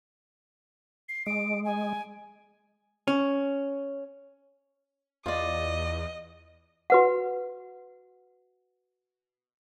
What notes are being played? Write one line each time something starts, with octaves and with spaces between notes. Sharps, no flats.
C7
G#3 D7
G#5
C#4
E2 F4 D5 D#5
F#4 B4 F#5